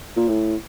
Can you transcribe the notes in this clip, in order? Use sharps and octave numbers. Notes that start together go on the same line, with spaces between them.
A#2
A2